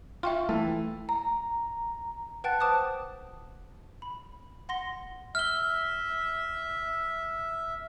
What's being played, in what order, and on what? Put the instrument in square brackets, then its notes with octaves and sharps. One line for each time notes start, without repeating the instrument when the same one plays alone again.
[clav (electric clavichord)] F4 [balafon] E5 G5 C#6
[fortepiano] E3 [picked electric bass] A3 [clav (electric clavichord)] A4
[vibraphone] A#5
[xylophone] B4 F#5 G5 A5 F#6 A6
C5 A5 D6 D#6 F#6
B5
F#5 C6 A#6 G7
[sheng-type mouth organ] E5 [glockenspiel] F6 G7